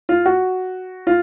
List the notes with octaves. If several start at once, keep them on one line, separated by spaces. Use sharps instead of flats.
F4
F#4
F4